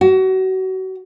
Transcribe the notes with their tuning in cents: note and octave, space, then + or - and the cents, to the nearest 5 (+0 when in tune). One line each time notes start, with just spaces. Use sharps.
F#4 +30